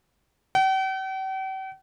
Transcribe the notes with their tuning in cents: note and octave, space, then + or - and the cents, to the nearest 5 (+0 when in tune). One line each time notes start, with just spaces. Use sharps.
G5 -45